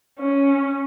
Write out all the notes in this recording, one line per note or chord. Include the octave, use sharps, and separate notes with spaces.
C#4